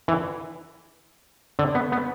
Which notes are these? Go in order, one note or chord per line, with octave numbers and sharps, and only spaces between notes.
E3
D3
B3
B3